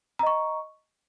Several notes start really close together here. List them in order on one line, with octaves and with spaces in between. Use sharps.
A#5 D#5 C#6